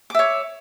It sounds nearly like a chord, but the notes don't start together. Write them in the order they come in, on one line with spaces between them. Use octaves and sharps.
D6 E5 C#5